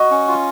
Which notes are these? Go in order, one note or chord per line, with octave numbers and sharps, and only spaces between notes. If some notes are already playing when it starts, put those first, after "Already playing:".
Already playing: F#4 D#5
C#4
F4